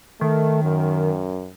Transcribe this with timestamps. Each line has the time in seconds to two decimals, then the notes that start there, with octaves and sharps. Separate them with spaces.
0.21 D#3 A3
0.63 F#2